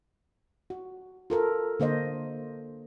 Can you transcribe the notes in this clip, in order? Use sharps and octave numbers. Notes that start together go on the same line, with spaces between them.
F#4
F4 A4 A#4
D3 A#3 C5 D#5